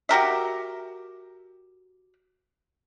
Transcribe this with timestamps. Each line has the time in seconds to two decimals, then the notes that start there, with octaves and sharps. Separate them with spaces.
0.09 F#4 G4 A#4 E5